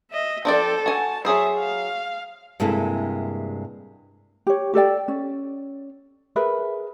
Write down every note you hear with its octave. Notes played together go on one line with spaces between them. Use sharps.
D#5 E5
F3 D4 A4 D5 G5
F#4 G#5 A5
F#3 G#4 C5 E5
F5
G2 C3 G#3 A#3 E4 A4
G4 C#5
G4 A4 D5 G5
C#4
G#4 A#4 B4 E5